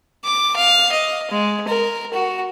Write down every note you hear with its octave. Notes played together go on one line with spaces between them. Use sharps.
D6
F5
D#5
G#3
A#4
F#4